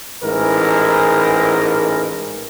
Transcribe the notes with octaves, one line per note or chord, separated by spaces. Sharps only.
A1 G#2 E3 A#4